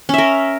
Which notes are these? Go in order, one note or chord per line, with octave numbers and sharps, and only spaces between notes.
C#4 A#4 E5